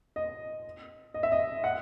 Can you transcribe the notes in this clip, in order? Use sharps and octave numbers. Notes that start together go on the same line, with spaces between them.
D#5
D#5
E5
D#5
F#5